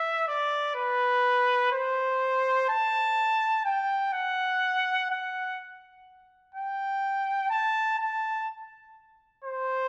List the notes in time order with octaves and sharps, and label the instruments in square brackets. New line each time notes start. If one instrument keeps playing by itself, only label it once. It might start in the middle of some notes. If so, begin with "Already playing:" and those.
Already playing: [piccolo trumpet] E5
D5
B4
C5
A5
G5
F#5
F#5
G5
A5
A5
C5